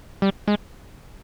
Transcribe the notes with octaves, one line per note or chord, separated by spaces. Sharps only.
G3
G#3